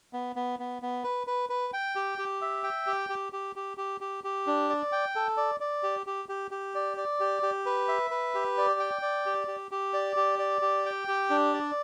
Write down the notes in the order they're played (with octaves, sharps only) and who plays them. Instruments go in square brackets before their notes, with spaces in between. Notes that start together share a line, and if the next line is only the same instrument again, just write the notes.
[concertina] B3
B3
B3
B3
B4
B4
B4
G5
G4
G4
E5
G5
G4
G4
G4
G4
G4
G4
G4
D4
D5
G5
A4
D5
D5
G4
G4
G4
G4
D5
D5
G4
G4
B4
E5
B4
G4
D5
G5
D5
G4
G4
G4
D5
G4
D5
G4
G5
G4
D4
D5